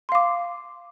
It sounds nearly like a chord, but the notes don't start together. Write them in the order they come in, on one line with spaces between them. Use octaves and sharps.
C6 F5 D6